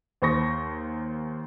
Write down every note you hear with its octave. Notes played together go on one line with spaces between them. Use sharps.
D#2 C5 C#6 A#6